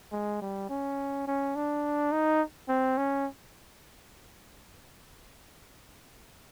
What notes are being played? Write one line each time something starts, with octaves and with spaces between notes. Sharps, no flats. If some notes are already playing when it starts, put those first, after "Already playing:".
G#3
G3
C#4
C#4
D4
D#4
C4
C#4